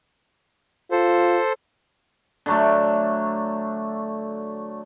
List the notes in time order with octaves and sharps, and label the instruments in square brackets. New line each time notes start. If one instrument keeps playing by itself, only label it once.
[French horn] F4 [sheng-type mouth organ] A4 C5
[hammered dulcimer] D3 F#3 A3